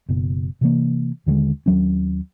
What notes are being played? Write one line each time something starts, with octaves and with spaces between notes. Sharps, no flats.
F#1 B2
C3 E3 A#3
D#2 D3 G3 G#3
D#2 F#3 C#4